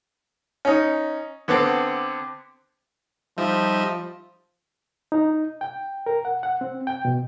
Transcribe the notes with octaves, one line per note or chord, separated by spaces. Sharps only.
C#4 D#4
D3 B3 C4 D6
F3 G3 D#4 E5
D#4
G5
A#4
F#5
F#5
C4
G5
B2